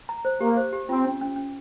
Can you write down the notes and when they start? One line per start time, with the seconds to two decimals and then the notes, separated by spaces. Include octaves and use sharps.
0.09 A#5
0.25 C5
0.41 A#3 G4
0.57 C5
0.73 G4
0.89 C4 F4
1.04 C#4
1.21 C#4
1.36 C#4